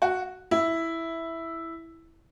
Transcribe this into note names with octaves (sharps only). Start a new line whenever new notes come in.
F#4
E4